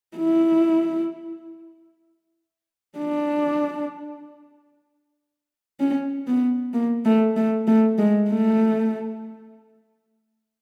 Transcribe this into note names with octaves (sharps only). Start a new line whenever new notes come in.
E4
D4
C#4
B3
A#3
A3
A3
A3
G#3
A3